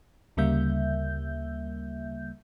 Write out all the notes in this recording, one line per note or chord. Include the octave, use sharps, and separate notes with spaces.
D2 C#3 G3 A#3 E5 G6